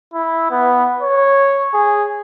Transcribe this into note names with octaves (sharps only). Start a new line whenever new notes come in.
E4
B3
C#5
G#4